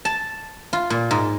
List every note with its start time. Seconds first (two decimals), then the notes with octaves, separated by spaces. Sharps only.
0.05 A5
0.73 F4
0.90 A#2
1.11 G#2